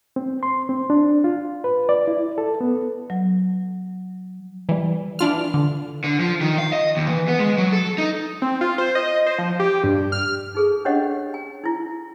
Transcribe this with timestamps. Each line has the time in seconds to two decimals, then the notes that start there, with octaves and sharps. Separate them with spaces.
0.16 C4
0.43 C6
0.69 C4
0.90 D4
1.24 F4
1.64 B4
1.89 D5
2.08 E4
2.38 A4
2.61 B3
3.10 F#3
4.69 E3 G3
5.19 E3 D4 F4 F6
5.54 D3
6.04 D3
6.20 F3
6.41 D#3
6.58 F5
6.73 D#5
6.97 D#2
7.09 E3
7.28 B3
7.39 G#3
7.58 F#3
7.72 A4
7.98 D#4
8.42 C4
8.61 F4
8.78 C5
8.95 D#5
9.26 C5
9.38 F3
9.60 G4
9.84 G2
10.12 F6
10.55 D#4 G#4 A4
10.85 C#4 D4 G4 C#5 D#5 F#5
11.34 G#5
11.64 D#4 E4